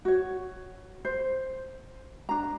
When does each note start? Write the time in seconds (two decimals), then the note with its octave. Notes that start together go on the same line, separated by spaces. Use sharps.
0.05 F#4 C#5
1.05 C5
2.29 D4 A#5